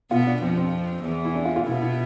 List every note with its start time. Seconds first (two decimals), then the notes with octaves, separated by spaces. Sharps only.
0.11 B2 B3 F4
0.27 D4
0.42 F2 F3 C4
0.57 C4
1.04 E2 E3
1.25 E4
1.35 D4
1.45 F4
1.56 F4
1.65 B2 B3 E4
1.82 E4